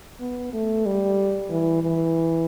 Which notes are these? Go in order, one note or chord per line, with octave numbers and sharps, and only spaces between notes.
B3
A3
G3
E3
E3